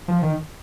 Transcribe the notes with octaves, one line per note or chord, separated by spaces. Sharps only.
F3
D#3